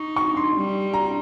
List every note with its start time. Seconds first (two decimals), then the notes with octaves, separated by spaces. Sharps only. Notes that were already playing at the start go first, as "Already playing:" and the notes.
Already playing: D#4 C#6
0.16 C#6
0.37 C6
0.55 G3
0.94 A#5